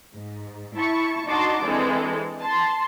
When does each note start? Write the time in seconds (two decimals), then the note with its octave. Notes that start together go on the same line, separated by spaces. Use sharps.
0.14 G#2
0.77 E4 A5 C#6
1.29 D4 D#4 F#4 A5 C6 D6
1.64 E3 G#3 C4 D4 A4
2.41 A5 C6